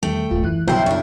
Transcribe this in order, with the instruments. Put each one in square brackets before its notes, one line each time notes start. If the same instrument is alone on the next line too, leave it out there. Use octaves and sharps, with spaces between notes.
[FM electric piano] E2 D#3 G3 [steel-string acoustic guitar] A3 G5
[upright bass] D1 A2 [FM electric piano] F4
[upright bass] F#2 [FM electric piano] E3 E4 F#6
[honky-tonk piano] B1 G5 [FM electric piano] G2 G6 C7 [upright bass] C#3 [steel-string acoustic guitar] E4 C5
[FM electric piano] F#2 C#6 [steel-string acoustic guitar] D4 E4